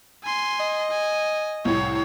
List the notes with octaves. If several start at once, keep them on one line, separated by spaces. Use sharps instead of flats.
G#5 C6
D#5
G#5
C2 A2 C#5